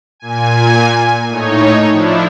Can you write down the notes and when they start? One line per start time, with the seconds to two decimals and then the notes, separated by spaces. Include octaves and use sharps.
0.20 A#2 G#5
1.28 A2 D#4 C#5
1.91 F3 D4 E4